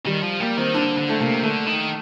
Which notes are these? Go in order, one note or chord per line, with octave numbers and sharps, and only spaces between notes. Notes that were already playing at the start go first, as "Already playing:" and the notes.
D#3 G3
F3
G3 A#3
D#3 C4
D3 D4
D3
A3
C3 A#3
D3 A3
D#3